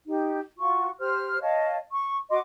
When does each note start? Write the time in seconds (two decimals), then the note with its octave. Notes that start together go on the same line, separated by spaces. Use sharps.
0.07 D#4 G4
0.58 F4 F#4 C#6
0.99 G4 C5 F6
1.41 C#5 D#5 F5 A5
1.91 C#6
2.30 F#4 D#5 C6 D6